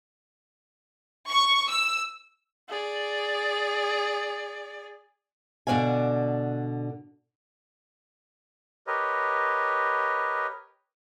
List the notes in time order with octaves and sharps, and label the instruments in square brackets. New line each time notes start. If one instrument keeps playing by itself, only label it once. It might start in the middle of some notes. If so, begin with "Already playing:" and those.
[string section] C#6
E6
[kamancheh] G#4 D5
[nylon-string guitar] B2 D3 D4 D5 F5 G#5
[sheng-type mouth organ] G4 A#4 B4 C#5 D#5